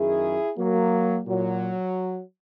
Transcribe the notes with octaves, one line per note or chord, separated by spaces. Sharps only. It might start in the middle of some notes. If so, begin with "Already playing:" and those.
Already playing: F#2 D#3 E4 G#4
F#3 A#3
A#2 F#3